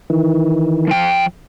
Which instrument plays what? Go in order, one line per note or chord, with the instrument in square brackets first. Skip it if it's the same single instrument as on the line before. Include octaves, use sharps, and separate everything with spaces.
[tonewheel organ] D#3 E3
[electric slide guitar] F3 G5